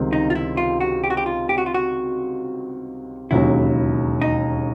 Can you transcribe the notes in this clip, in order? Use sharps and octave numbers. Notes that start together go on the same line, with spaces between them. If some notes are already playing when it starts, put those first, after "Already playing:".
Already playing: C#2 C3 D#3 G3 C4
D#4
F4
E4
F4
F#4
G4
F#4
G4
F4
G4
F#4
F4
F#4
E1 D#2 C#3 F#3 E4
D#4